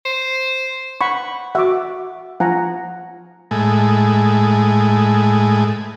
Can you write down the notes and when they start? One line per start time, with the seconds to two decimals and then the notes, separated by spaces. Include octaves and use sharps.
0.06 C5
1.01 F#5 B5 C#6
1.55 F#4 E5 F#5 D6
2.40 F3 F#5 G#5 A#5
3.51 A2 G#3